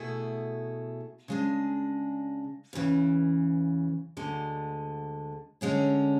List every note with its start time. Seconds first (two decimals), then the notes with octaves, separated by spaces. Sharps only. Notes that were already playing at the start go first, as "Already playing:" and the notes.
Already playing: B2 A3 E4 G#4
1.28 C#3 G#3 D4
2.73 E2 C#3 E3
4.17 D2 D3 G#3
5.61 D3 G#3 C#4 G#4